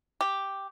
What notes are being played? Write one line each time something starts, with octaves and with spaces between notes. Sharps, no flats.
G4